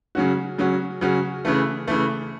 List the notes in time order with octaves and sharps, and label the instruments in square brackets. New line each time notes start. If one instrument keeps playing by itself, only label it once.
[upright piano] C#3 F#3 C#4 F#4
C#3 F#3 C#4 F#4
C#3 F#3 C#4 F#4
C#3 E3 A3
C#3 E3 A3